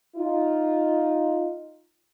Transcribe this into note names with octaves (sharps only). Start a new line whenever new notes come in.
D#4 F4